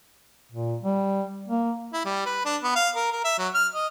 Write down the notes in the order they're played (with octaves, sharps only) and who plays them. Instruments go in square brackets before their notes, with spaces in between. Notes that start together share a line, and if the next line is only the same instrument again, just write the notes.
[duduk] A#2
G3
A#3
[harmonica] E4
G3
B4
D4
B3
F5
A#4
A#4
E5
F#3
F6
D#5